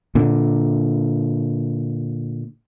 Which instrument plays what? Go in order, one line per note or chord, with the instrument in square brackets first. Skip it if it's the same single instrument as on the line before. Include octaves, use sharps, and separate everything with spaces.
[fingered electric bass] A#2 D3